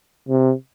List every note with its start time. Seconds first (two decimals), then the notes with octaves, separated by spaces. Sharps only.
0.29 C3